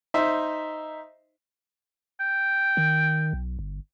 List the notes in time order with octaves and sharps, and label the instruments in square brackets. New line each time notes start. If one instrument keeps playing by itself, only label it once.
[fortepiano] D#4 C5 E5
[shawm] G5
[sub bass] D#3
B1
G1